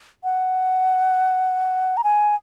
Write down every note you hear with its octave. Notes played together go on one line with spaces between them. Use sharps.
F#5
A#5
G#5